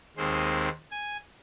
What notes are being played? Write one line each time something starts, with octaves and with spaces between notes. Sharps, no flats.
D#2 D#3 G#3 C4 C5
G#5